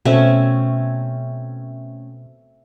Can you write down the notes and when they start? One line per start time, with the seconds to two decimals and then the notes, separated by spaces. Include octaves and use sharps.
0.05 B2 A3 C4 C#4